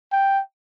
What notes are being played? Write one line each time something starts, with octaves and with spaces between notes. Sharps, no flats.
G5